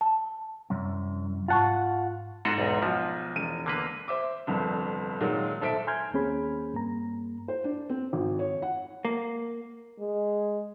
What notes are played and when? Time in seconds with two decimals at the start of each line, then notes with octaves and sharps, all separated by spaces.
0.01 A5
0.70 C2 F#2
1.48 G#2 F4 F#5 A5 C#6
2.45 G#2 F#4 G#4 A4 A#6 E7
2.58 B1 E2
2.82 B1 F3 F#4
3.36 E1 D#7
3.66 D3 A#3 B4
4.08 C5 E5 D6
4.47 G1 C2 F2
5.21 A#2 D#3 F#3 G#3
5.61 B1 A4 C5 E5 B6 D7
5.87 G#5 A#5 C6 F6 G6 G#6
6.13 D#2 A#3 C4 C#4 G#4 B5
6.74 G2 A#3 A#5
7.48 C5
7.64 D4
7.89 C4
8.13 G#1
8.39 C#5
8.62 F#5
9.05 A#3
9.99 G#3